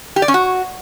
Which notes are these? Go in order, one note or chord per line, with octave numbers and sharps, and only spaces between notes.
G4
D5
C#4
F#4